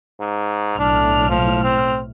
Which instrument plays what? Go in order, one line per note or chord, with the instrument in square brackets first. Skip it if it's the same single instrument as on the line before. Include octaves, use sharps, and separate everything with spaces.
[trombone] G#2
[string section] B1 A2 F6 [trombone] D4
[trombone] F3
C4